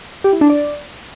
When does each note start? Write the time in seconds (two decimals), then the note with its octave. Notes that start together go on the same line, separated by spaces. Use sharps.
0.24 G4
0.33 E4
0.41 D4
0.50 D5